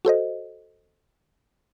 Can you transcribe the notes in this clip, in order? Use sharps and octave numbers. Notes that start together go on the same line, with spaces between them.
F#4 A4 C5 D#5